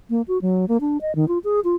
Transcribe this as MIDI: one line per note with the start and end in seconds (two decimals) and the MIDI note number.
0.10 0.22 58
0.28 0.41 66
0.42 0.65 54
0.69 0.77 58
0.81 0.98 62
1.01 1.15 75
1.15 1.28 51
1.28 1.38 65
1.44 1.60 68
1.64 1.76 65